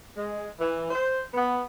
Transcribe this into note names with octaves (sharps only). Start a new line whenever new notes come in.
G#3
E3
C5
B3